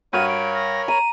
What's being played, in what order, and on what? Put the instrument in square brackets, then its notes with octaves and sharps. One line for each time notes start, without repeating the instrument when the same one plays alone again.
[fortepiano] G2 F#4 F6 [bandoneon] A#4 C#5 B5 [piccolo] D#7
[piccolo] D7
A#6
[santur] A#5 [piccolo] D#7